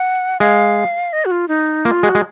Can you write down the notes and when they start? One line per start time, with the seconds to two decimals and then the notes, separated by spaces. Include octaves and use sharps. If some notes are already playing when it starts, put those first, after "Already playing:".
Already playing: F#5
0.40 G#3 F5
1.13 D#5
1.25 F#4
1.31 F4
1.48 D#4
1.85 A#3 F4
2.03 G#3 F#4
2.15 G#3